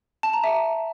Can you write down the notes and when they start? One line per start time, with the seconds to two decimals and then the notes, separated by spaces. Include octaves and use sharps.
0.23 A5
0.33 A#5
0.44 E5